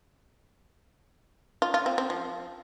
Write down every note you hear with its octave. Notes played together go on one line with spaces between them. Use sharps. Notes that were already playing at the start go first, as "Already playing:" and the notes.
F4
F4
C4
C4
F3